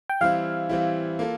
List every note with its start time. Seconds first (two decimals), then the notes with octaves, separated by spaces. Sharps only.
0.10 G5
0.21 E3 G3 C4 E4 F5
0.69 E3 G3 C4 E4
1.19 A#3 F4 A4